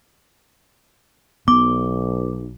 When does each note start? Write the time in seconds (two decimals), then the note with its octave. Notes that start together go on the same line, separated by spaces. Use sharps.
1.48 B1 B3 D6